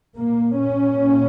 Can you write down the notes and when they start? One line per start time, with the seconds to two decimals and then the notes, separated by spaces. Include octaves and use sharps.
0.17 A#2 A#3
0.58 C#4